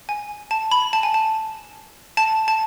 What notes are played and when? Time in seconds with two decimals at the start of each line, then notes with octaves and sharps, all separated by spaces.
0.09 G#5
0.51 A5
0.71 B5
0.93 A5
1.03 G#5
1.14 A5
2.17 A5
2.48 A5